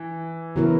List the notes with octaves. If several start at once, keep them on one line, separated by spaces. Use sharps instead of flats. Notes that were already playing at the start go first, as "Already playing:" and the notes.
Already playing: E3
C#3 E3 F#3 B3 E4 A#4